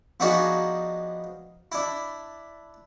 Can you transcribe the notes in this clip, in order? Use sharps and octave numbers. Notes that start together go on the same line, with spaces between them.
F3 B3 D4 D#4 F#4 G#4
D4 E4